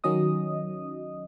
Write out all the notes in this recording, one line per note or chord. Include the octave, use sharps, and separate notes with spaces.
D#3 F#3 C#4 D#5 D#6